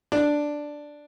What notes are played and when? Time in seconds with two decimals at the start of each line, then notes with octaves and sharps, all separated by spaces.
0.12 D4